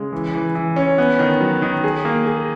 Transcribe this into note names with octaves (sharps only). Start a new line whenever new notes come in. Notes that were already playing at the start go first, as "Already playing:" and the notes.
Already playing: C#3 G#3
E3
E3
E3
C#4
B3
D#3
F#3
D#3
G#4
A#3
G#4